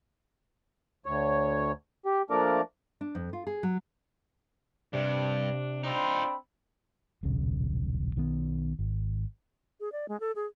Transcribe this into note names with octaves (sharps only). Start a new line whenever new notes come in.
D2 C#5
G4
F3 A3 A#3 D4 A#4 D5
D4
F2
F4
G#4
F#3
G2 C3 D4
C4 D4 D#4 F4 B5
D#1 B1 C#3
B1 D#3 F#3 B3
G#1
G#4
D5
G#3
A4
G#4